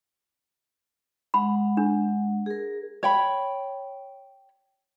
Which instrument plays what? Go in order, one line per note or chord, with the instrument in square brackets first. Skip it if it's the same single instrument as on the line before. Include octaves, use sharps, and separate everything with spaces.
[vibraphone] G#3 F#5 [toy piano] B5
[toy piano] D4
[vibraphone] G#4 A#4
[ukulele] C#5 G5 B5